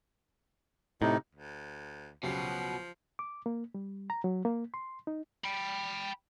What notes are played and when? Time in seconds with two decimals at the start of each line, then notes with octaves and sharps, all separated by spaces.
1.02 A2 C3 D#4
1.35 D2
2.23 C#2 B2 F3 F#3 G4
3.19 D6
3.46 A#3
3.75 G3
4.10 A#5
4.24 F#3
4.45 A#3
4.74 C6
5.07 D#4
5.44 G5 B5